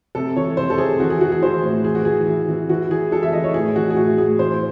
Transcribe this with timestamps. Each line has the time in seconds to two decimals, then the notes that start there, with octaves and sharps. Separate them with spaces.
0.15 C3 A4
0.36 E3 C#5
0.57 C3 C5
0.70 A4
0.78 C3 G#4
1.00 E3 F#4
1.10 G#4
1.21 E3 F#4
1.32 G#4
1.42 E3 C5
1.63 A2
1.84 E3 G#4
1.95 F#4
2.05 E3 G#4
2.27 E3
2.48 E3
2.69 E3 F#4
2.91 E3 G#4
3.12 E3 A4
3.23 E5
3.33 E3 D#5
3.44 C#5
3.54 A2 G#4
3.76 E3 F#4
3.90 G#4
3.96 A2 F#4
4.18 A2 G#4
4.39 E3 C5